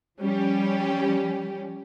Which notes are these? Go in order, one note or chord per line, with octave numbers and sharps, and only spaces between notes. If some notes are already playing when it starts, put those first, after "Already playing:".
F3 G3 C#4 G4